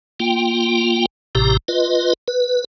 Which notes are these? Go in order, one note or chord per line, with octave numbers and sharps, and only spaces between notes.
A#3 F4 G5
A1 A2 C3 G4 A#5
F4 B4 D#5
B4